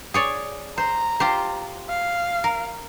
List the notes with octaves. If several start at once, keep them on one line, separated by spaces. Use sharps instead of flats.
G#4 C#5 D5
C5 A#5
F4 G4 C5
F5
A#4